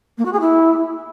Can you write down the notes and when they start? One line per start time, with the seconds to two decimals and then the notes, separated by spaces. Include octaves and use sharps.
0.18 A#3
0.25 F#4
0.33 G#4
0.40 E4